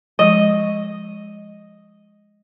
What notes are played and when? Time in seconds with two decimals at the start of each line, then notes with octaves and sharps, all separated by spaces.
0.19 F3 G#3 D#5